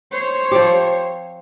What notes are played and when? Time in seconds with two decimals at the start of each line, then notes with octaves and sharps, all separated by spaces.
0.12 C5 C#5
0.52 F3 C4 G4